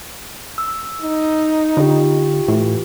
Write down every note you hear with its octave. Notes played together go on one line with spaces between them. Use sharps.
E6
D#4
D3 F4 G4
A2 E3